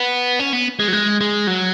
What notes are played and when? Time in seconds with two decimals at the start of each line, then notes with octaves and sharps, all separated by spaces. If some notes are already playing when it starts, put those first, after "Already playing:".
Already playing: B3
0.39 C#4
0.53 B3
0.79 G#3
0.88 F#3
0.93 G#3
1.21 G#3
1.47 F#3